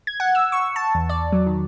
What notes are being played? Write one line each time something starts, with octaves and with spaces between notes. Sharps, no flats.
G#6
F#5
E6
C#6
A5
E2
D5
F#3
D#3